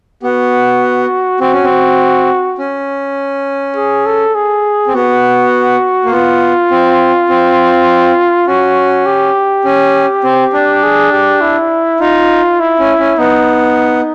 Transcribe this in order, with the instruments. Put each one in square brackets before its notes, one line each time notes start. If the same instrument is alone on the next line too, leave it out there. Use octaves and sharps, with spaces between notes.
[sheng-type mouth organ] B3 [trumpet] F#4
[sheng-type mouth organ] C4 [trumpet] F#4
[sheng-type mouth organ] C#4
C4
C#4
[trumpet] G#4
A4
G#4
[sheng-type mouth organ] C4
[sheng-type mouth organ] B3 [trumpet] F#4
[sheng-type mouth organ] A#3
[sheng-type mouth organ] B3 [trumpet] F4
[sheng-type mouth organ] C4
C4
[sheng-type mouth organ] C#4 [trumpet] F#4
[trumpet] G4
[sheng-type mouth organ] C#4
C4
D4
[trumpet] G#4
G4
E4
[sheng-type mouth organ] D#4 [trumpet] F4
[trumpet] E4
[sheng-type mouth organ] C#4
C#4
[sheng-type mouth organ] B3 [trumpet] D#4